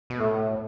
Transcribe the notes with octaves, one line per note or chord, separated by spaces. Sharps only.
B2
A2 A3